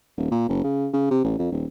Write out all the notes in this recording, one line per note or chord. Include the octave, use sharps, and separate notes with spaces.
D#1
A#2
F#1
C#3
C#3
C3
A1
F2
D#1